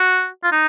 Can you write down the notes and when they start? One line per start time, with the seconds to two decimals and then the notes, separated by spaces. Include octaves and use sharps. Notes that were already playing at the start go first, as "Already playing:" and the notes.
Already playing: F#4
0.44 F4
0.52 D#4